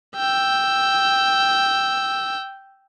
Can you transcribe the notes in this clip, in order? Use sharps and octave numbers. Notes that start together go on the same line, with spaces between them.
G5 E6